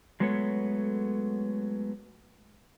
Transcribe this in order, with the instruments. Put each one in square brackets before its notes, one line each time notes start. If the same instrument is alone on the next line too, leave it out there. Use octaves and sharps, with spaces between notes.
[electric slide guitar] F#3 G#3 A3 B3 A4 C#5